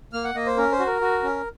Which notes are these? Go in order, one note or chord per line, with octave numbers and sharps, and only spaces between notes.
A#3 F6
F#5
A#3 D#5
C5
C#4 A#4
C5
F#4
A#4
F#4
C#4